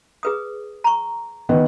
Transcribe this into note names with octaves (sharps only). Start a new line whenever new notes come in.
G#4 B4 D#6
A#5 C#6
D#3 B3